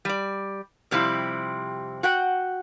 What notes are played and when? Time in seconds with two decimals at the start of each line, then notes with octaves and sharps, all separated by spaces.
0.05 G3 D5
0.91 F2 C3 G3 C4 E4
2.03 F#4 F#5 G5